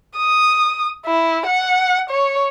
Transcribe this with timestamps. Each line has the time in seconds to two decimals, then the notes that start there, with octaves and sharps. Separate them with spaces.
0.16 D#6
1.06 E4
1.47 F#5
2.10 C#5